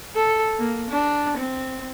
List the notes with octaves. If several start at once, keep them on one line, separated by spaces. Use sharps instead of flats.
A4
A#3
D4
C4